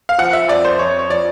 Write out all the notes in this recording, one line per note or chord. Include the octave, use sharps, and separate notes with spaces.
F5
F3 F#5
E5
F2 D5
C5
F2 C#5
C#5
F3 D5